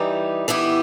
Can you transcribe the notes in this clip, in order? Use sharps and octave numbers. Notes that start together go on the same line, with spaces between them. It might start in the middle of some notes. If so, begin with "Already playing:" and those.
Already playing: E3 G3 D#4 G4
E3 B3 E4 G4